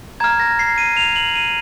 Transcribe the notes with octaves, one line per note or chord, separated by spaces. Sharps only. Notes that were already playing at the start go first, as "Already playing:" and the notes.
A#5 F6 G#6
A#6
C7
D#7
F7
F#7
D#7